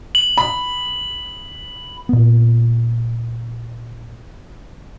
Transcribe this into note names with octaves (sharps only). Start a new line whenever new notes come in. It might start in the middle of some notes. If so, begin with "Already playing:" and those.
F#7
B5
A#2 B3